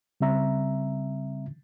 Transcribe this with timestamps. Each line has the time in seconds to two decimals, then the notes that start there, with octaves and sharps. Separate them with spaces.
0.21 C#3 G3 C4 E5 A#5